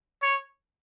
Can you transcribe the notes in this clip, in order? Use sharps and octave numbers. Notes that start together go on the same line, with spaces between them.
C#5